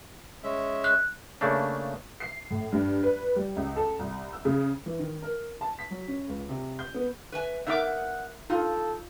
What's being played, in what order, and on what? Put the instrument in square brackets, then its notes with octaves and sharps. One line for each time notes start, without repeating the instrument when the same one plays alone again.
[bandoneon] G#3 C#4 E5
[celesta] F#6
[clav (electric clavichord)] C#3 A3 A#3 D4
[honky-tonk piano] C7
A2
G2
B4
G3
C#2
A4
C2
E6
C#3
[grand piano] E3
D#3
A#4
A5
B6
F#3
C#4
C#2
C3
G6
B3
[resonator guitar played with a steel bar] B4 E5 G#5
[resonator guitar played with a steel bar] B3 D#4 A#4 [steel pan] E5 D6 [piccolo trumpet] F#5
[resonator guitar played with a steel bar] D#4 [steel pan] F4 [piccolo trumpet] A4